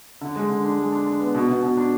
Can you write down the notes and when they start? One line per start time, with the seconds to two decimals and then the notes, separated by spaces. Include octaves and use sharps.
0.21 D3
0.36 G#3
0.50 D3
0.65 D4
0.78 G#3
0.92 D4
1.06 D4
1.20 B3
1.35 B2
1.49 B2
1.63 B2
1.77 D4